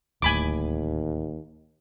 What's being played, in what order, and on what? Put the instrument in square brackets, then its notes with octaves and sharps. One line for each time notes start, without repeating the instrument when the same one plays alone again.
[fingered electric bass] D1 A2 [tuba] D#2 [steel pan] G#5 B5 D6